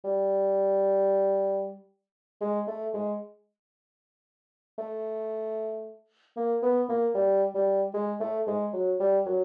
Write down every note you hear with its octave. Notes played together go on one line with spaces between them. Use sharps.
G3
G#3
A3
G#3
A3
A#3
B3
A#3
G3
G3
G#3
A3
G#3
F#3
G3
F#3